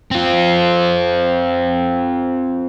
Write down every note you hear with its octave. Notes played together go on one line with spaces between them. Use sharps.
C4 F4